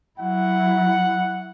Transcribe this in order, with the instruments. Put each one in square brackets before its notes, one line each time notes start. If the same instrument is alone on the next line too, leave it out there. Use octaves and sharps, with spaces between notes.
[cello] F#3 E4 [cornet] F#5